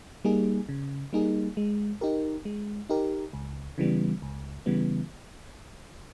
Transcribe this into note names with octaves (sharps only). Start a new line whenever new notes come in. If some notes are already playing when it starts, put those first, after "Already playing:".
G3 A#3 D#4 G#4
C#3
G3 A#3 D#4 G#4
G#3
D#4 G4 A#4
G#3
D#4 G4 A#4
C#2
C#3 E3 G3 B3
C#2
C#3 E3 G3 B3